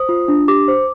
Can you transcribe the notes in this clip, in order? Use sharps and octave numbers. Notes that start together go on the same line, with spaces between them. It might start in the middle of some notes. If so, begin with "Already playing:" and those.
Already playing: C5 D#6
F4
D4
G4 D6
C5